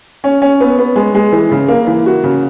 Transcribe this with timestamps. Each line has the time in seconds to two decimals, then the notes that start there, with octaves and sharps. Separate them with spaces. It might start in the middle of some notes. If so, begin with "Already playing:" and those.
0.24 C#4
0.42 C#4
0.60 B3
0.78 B3
0.96 G#3
1.15 G#3
1.33 E3
1.51 C#3
1.68 A#3
1.87 E3
2.06 F#4
2.24 C#3